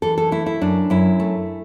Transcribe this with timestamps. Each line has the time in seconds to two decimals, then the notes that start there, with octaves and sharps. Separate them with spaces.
0.02 E3 A4
0.18 A4
0.32 A3 E4
0.46 E4
0.61 F#2 D4
0.90 F#2 E4
1.20 A3